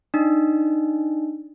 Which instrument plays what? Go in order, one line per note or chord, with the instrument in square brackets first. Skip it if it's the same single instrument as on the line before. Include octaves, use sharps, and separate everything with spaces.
[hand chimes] D4 D#4